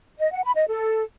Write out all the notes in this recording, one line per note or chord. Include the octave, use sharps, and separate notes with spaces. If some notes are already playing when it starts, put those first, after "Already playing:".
D#5
F#5
B5
D#5
A4